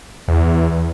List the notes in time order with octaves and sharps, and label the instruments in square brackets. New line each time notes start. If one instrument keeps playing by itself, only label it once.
[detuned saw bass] E2